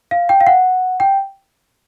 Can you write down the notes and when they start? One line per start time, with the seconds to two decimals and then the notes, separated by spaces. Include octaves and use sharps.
0.11 F5
0.29 G5
0.41 F5
0.47 F#5
1.00 G5